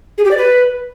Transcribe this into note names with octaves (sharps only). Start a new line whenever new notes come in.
G#4
G4
D5
B4